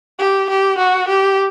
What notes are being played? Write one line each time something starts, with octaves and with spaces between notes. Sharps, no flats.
G4
G4
F#4
G4